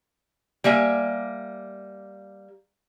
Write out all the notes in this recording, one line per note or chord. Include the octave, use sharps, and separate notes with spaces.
G3 A#3 E5 G#5